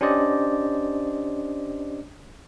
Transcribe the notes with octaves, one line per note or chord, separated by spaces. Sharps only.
C#4 D4 G4 C5 D5 D#5